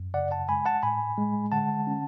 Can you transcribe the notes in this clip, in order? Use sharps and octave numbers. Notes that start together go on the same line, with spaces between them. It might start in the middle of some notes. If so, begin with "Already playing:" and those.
Already playing: F#2
C#3 D5 F#5
F#5 A5
G#3 G#5 B5
F#5 A5
A2 G#5 B5
G#3
D3 F#5 A5
C#4